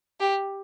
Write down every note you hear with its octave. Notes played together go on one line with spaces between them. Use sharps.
G4